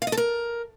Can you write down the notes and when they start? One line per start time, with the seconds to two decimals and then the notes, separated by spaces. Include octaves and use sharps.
0.02 F5
0.07 D#5
0.12 A4
0.17 A#4